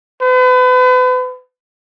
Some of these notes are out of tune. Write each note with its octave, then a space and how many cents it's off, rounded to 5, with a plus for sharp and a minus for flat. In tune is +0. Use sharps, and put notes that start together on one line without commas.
B4 +35